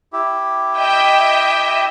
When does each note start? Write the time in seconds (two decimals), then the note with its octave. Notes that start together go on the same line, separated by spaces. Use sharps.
0.13 E4 G4
0.79 D#5 E5 G5